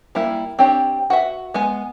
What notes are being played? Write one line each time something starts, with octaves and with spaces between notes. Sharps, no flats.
G3 A#3 E4
C4 D4 G4 C#5
F#4 B4 E5
G#3 B3 G#5